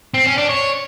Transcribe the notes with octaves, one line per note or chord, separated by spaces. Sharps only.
C4
C#4
D4
C#5